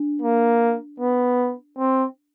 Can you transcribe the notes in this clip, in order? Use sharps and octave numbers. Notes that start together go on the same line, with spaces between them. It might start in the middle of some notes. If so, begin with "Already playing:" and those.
Already playing: D4
A#3
B3
C4